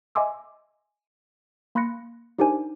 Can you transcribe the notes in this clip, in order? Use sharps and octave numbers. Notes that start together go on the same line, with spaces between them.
D#5 E5 G#5 C6 D6 E6
A#3 B5 C6 F#6 A#6 C#7
D4 D#4 G4 A#4 C5 G#5